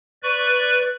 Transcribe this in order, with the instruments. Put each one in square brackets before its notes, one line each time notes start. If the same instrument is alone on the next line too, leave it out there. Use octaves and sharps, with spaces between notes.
[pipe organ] B4 D5 C#6